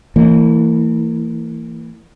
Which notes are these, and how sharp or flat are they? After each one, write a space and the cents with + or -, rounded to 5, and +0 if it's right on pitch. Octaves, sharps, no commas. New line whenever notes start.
E3 +0 A#3 -40